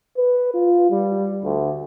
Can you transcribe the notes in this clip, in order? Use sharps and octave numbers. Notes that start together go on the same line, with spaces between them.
B4
F4
G3
D2